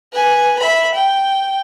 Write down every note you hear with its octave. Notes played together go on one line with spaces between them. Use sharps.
B4 G#5
E5 B5
G5